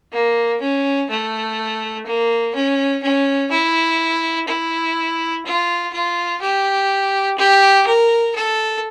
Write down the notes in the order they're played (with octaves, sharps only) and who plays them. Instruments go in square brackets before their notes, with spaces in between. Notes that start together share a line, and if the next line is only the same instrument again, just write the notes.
[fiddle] A#3
C#4
A3
A#3
C#4
C#4
E4
E4
F4
F4
G4
G4
A#4
A4